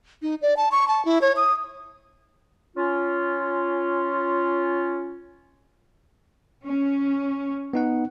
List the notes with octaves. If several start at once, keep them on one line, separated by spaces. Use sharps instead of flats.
D#4
D5
A5
C#6
A5
E4
C#5
D#6
C#4 F4
C#4
B3 D#4 F#5